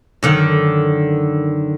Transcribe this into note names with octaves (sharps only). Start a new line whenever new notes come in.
F#2 D3 D#3